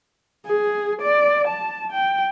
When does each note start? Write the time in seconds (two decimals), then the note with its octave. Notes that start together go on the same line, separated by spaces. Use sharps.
0.46 G#4
1.01 D5
1.47 A5
1.92 G5